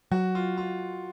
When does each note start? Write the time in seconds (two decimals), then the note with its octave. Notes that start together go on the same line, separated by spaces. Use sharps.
0.11 F#3 F#4
0.35 F4
0.58 F4